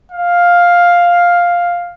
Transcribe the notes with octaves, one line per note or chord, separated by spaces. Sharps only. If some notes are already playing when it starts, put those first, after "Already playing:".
F5